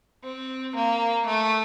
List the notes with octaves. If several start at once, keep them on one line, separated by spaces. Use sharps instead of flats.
C4
A#3
A3